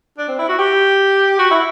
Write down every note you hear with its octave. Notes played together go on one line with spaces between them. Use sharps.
D4
C4
E4
F#4
G4
F#4
E4